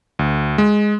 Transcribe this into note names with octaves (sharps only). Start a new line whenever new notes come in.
D2
G#3